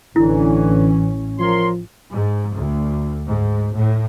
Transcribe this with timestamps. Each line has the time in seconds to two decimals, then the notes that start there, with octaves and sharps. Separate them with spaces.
0.16 A1 A2 D3 E3 C#4 E4
1.39 F3 A#4 C#5 C6
2.12 G#2
2.56 D2
3.29 G#2
3.75 A2